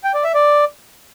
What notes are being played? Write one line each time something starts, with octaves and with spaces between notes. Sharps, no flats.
G5
D5
E5
D5